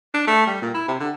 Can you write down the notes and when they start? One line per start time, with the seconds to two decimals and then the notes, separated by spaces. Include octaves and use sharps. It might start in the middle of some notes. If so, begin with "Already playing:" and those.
0.14 D4
0.27 A3
0.47 G3
0.62 A#2
0.74 E4
0.88 C3
1.00 D3